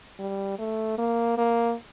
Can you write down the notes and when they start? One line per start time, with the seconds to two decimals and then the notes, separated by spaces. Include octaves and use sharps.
0.19 G3
0.59 A3
0.98 A#3
1.38 A#3